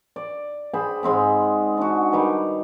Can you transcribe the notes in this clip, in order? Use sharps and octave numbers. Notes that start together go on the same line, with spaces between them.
D5
G#4 C5 G5 B5
G#2 G#3 C4 B5
D4 F#4
D#3 G3 B4